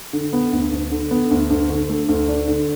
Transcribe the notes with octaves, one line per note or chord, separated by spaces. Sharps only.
D3
B3
D2
D2
D3
B3
D2
D2
D3
A3
D2
D4
D3